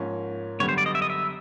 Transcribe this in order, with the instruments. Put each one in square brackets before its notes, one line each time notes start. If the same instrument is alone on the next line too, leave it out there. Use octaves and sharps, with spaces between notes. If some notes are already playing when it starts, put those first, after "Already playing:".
Already playing: [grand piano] G#2 F3 A#3 C#4
[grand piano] F#2 D3 G3 B3 [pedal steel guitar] C#5
[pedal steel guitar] C5
D5
D#5
E5
D#5
E5